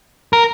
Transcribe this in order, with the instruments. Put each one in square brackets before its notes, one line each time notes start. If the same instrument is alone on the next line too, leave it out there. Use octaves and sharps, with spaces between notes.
[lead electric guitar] A#4